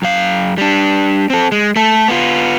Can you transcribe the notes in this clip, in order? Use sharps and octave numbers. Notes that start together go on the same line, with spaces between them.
F#2 F5
G3 D4
C4 A4
G#3
A3 A4
B3 F4